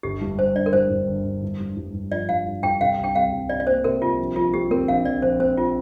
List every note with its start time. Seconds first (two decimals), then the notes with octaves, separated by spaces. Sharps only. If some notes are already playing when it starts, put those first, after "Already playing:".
0.03 G1 G4
0.21 G2
0.39 G3 C5
0.56 G1 D5
0.66 A#4
0.73 G2 C5
0.90 G2
1.08 G1
1.25 G1
1.42 G2
1.60 G2
1.77 G2
1.94 G2
2.11 F3 D5
2.29 G2 F5
2.46 G2
2.63 G2 G5
2.80 C3 F5
2.98 C2
3.04 G5
3.15 C2 F5
3.32 C2
3.49 C3 D5
3.60 D5
3.67 A#3 C5
3.84 C3 A#4
4.02 C2 F4
4.19 A#1
4.36 F3 F4
4.54 C4 G4
4.71 C4 A#4
4.88 A#1 F5
5.05 A#1 D5
5.22 A#1 C5
5.40 C4 C5
5.57 F4